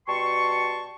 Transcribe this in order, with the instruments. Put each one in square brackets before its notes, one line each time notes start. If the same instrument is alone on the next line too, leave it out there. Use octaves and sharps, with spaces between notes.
[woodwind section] B2 G3 G5 A5 C6 C#6